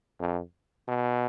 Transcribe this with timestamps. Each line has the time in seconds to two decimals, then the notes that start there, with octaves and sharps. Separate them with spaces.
0.19 F2
0.88 B2